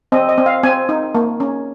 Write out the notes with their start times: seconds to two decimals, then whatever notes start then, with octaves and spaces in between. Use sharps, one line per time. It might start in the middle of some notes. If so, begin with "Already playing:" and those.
0.12 C4 D#5
0.29 D#5
0.38 C4
0.46 F5
0.63 C4 G#5
0.89 D#4
1.15 A#3
1.40 C#4